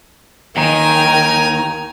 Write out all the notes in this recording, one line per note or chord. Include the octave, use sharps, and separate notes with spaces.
D#2 D#3 A#4 G5 G#5 A#5